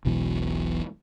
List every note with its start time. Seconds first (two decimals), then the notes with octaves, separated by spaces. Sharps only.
0.05 E1 B1 B2 E3